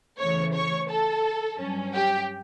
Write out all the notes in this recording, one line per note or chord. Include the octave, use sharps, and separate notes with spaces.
E2 C#3 E3 A3 C#5 C#6
C#5 C#6
A4 A5
G2 F#3 C#4
G4 G5